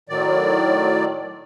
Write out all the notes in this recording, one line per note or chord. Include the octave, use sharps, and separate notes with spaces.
A2 D#3 F#3 D5